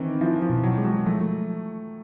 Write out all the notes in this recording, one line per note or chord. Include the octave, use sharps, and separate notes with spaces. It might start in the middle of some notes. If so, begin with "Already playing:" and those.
Already playing: D#3 E3 C4
F3 E4
F3
B2
F#3
G#3
F#3
F3 A3